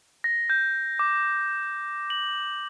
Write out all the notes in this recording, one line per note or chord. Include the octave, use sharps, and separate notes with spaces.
A#6
G6
D6
F#7